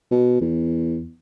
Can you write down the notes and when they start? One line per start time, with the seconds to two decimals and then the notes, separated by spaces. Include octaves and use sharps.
0.11 B2
0.41 E2